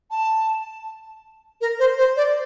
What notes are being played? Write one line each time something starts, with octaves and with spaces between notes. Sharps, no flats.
A5
A#4
C5
C5
D5